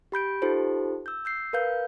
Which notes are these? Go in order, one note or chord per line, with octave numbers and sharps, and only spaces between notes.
G4 B5 G6 D7
D#4 F4 G4 A4 C5
E6 G6
E6 G6 C7
A#4 B4 F5 G6